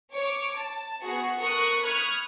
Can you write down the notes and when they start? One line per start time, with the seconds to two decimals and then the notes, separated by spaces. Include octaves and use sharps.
0.15 C#5 C#6 D6
0.56 A5
1.05 B3 F#4 G#4 C#6
1.40 A4 A#4 C#6 D#6 F#6
1.82 B5 C#6 D#6 F6 F#6 G#6